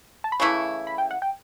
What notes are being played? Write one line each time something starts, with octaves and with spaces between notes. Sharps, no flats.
A5
B5
C#3 E3 A3 E4 C#6
B5
G5
F#5
G5